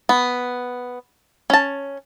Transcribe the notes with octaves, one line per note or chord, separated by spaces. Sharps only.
B3
C#4 A5